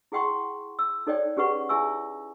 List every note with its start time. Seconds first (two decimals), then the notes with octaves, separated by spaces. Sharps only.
0.12 E4 G#4 F#5 G5 C6 C#6
0.79 E6
1.07 D#4 A4 C#5 D5 G5
1.37 C#4 G4 G#4 B4 F#5 C#6
1.69 E4 G#4 E5 G#5 C#6 E6